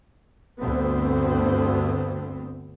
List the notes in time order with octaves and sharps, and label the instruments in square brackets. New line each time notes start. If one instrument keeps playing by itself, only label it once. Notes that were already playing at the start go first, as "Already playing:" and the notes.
[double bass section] D2 G2 B3 C4